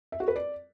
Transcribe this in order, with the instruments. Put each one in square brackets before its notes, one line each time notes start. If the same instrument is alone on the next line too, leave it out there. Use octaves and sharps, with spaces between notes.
[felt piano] E5
F#4
B4
D5